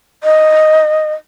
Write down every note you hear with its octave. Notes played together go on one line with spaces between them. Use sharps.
D#5